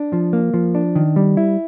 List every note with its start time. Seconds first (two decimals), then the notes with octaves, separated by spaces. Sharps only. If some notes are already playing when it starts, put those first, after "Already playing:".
Already playing: D4
0.13 F3
0.33 A#3
0.54 F3
0.75 D4
0.96 D#3
1.16 G3
1.37 E4